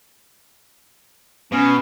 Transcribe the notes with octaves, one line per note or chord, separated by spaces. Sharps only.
B2 C#4